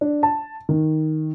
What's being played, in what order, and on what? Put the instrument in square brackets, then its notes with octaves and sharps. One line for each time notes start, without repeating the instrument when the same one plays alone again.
[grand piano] D4
A5
D#3